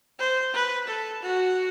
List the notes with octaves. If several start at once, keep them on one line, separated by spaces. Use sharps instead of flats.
C5
B4
A4
F#4